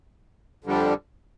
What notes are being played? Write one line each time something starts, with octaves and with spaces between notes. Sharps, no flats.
F2 D3 G3